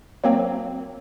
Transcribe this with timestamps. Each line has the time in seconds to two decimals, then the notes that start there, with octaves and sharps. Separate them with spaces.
0.24 F#3 A#3 C4